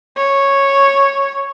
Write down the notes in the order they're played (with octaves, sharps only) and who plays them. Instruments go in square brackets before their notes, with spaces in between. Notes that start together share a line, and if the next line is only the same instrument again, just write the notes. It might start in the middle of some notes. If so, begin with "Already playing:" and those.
[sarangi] C#5